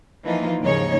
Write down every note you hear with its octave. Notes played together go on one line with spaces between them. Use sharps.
E3 F3 A#3 D#4 F4
D#2 G#2 C#3 F3 D#4 C#5